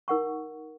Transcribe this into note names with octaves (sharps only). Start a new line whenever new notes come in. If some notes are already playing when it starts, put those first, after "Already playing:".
D#4 A#4 F#5 C#6